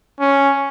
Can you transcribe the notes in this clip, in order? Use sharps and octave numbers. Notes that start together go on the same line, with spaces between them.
C#4